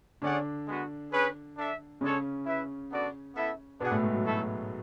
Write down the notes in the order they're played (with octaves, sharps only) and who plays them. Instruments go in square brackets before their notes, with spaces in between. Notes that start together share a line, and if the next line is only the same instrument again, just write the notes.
[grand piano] D3 D4 [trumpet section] C#4 G#4 D5 F#5
[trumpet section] G#3 B3 F#4
C#4 G#4 B4
D4 A4 E5
[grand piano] C#3 C#4 [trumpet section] G#3 D4 A4 C#5
[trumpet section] E4 B4 E5
B3 D4 F#4 A4 D5
B3 E4 A4 E5
[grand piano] B2 B3 [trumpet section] D4 G#4 D5 F#5
[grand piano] A2 A3
G#2 G#3
F#3
[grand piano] F#3 [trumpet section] A3 E4 A4 E5